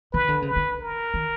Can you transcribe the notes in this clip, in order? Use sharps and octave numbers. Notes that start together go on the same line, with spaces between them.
D#3 B4
D3
C#3 B4
D3
A#4
D#3